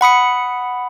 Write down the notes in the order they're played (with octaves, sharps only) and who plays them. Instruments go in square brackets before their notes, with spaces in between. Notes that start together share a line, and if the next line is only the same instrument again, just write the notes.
[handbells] F#5 B5 D#6 C#7